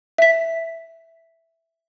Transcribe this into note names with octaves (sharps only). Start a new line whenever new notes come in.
E5 B6